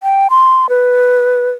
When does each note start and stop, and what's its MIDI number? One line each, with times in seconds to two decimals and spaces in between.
0.03 0.28 79
0.30 0.69 84
0.69 1.50 71